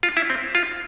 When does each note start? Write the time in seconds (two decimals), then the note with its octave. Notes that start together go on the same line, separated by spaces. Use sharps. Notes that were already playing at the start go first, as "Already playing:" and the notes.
0.03 F4
0.17 E4
0.30 C4
0.55 F4